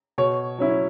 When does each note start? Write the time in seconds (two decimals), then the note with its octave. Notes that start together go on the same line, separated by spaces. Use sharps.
0.18 B2 C#5
0.59 F#3 C#4 E4